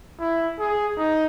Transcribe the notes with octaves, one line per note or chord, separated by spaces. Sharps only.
E4
G#4
D#4